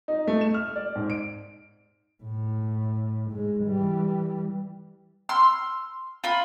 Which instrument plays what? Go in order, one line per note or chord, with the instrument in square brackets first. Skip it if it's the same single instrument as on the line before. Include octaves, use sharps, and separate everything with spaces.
[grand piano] D#4
A3
E7
F6
D5
G#2
D7
[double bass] A2
G#2 G#3
E3 G3
[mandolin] C6 E6 F6
F4 B5